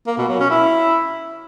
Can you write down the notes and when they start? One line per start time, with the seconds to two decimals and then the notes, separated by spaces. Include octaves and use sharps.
0.07 A#3
0.18 B2
0.29 F#3
0.39 C#4
0.50 E4